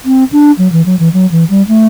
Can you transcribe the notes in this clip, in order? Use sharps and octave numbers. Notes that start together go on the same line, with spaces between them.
C4
D4
F#3
E3
F#3
E3
F#3
E3
G3
A3